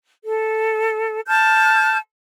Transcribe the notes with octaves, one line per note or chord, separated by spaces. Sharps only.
A4
A5 F6 G6